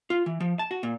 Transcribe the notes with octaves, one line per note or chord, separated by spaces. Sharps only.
F4
E3
F3
A5
F#4
A#2